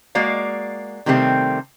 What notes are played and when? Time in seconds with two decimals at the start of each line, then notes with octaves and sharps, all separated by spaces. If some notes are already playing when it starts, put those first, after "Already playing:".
0.15 G#3 A#3 F#4 D5 F5
1.06 C3 D#3 G3 A3 B3 C4